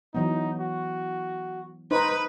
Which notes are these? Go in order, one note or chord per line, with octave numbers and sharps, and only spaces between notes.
E3 F#3 B3 D#4
F#4
D#4 B4 C5